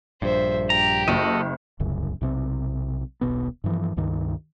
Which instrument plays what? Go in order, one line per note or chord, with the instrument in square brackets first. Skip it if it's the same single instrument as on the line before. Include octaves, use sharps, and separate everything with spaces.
[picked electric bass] A#1 G2 [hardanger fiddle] C5 E5
[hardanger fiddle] G4 [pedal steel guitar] A#5
[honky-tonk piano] F#1 [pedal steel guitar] F#4 A4 D#5
[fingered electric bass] D1 C2 F#2 C#3
B1 C3 C4
D#1 B1 B2 B3
G2 E3 F3
C#2 G2 D#3